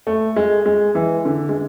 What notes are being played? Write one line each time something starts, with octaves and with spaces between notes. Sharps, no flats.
A3
G#3
G#3
E3
D3
G#3